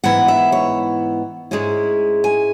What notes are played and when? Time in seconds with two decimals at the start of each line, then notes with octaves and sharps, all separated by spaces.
0.04 G#2 E3 B3 E4 F#5
0.28 E5
0.52 C#5
1.51 G#2 G#3 C#4 E4
2.24 G#5